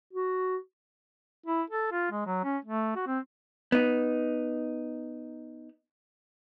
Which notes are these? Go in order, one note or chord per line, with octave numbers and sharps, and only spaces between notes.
F#4
E4
A4
F4
G#3
F#3
C#4
A3
F#4
C4
B3 D#4